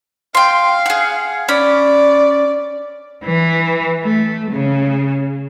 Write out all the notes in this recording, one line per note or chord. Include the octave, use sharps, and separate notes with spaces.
F5 G5 C6
G#4 F#5
C#4 D5 B5
E3
A3
C#3